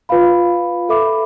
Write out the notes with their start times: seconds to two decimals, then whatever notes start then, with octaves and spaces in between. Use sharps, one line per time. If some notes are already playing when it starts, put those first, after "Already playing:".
0.09 F4 B4 F5 B5
0.89 A4 E5 B5 D6